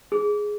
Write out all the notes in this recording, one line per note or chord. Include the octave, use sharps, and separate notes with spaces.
G#4